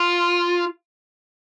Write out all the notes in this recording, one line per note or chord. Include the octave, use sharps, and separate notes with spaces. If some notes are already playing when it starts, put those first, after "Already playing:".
Already playing: F4